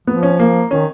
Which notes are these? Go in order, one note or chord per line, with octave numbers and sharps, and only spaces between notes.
F3 B3
C#4
A#3
D#3 C#4